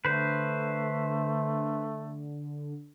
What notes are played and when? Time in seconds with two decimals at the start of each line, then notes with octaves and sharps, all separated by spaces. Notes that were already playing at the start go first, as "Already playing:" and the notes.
0.05 D3 A3 B4 C5